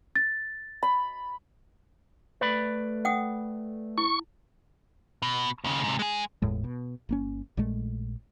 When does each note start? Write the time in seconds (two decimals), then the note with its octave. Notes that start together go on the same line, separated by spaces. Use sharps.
0.16 A6
0.83 B5
2.41 A3 B4 D5 B5
3.05 F#5 G5 D#6
3.98 E4 C#6
5.22 B2
5.64 D#2 C#3
5.84 G#2 C3
5.99 G#3 G#4
6.42 G1 E2 A2 G#3
6.64 B2
7.09 G1 A#3 C#4
7.57 A#1 A#2 G#3 A3